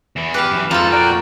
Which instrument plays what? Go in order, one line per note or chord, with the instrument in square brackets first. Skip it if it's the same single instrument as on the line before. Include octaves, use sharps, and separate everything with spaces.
[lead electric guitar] E2 E3
[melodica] G4 [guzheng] B4 F5
[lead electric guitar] F#2 E3
[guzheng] F2 A4 [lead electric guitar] G#2 A#5 [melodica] F4
[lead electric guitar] A#2 D5 [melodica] F#4 A#4 G5